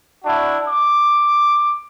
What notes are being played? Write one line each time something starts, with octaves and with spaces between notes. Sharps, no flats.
D4 E4 F#4
D6